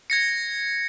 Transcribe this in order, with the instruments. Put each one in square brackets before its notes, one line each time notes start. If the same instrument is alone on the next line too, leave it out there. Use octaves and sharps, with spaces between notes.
[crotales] G#6 A#6 C#7